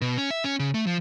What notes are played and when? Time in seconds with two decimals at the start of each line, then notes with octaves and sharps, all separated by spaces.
0.02 B2
0.18 C#4
0.31 E5
0.44 C#4
0.60 C#3
0.74 A3
0.87 F3